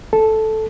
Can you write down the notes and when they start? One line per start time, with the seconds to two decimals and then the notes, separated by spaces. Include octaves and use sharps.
0.13 A4